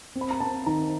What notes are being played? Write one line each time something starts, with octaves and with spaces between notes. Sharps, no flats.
C4
B5
A#5
C4 A5
D#3 A#5